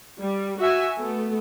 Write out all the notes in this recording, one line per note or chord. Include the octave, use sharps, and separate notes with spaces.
G3
F#4 E5 G#5
A3 B3